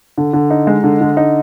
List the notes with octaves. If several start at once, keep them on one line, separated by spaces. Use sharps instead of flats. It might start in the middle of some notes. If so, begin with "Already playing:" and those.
D3
D3
D#4
G#3
D3
D3
D#4